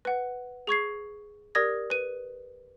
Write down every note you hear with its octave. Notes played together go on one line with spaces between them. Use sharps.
B4 F#5
G#4 C#6 G#6 C7
G4 A#4 D5 D#6 G#6 A#6
B4 D#7